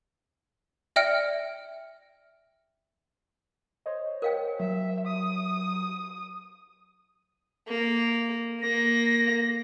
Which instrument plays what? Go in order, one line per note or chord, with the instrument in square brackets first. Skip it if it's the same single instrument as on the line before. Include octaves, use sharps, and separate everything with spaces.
[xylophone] D5 E5 G5 F6 C#7
[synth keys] C5 C#5 D#5
[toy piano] A#4 F5 G5
[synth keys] F#3 [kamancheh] E5
[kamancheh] D#6
[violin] A#3
[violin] A#3 [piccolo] A#6